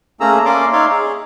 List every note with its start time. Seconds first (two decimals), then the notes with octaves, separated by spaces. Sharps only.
0.20 A3 A#3 C#4 G#4 A#5 E6
0.45 A#3 C#4 D5 E5 C6 D6
0.73 D#4 C#5 D5 E5 F5 C6
0.91 G#4